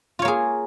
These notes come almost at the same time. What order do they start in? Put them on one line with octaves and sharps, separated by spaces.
F4 C#5 A#3 G#4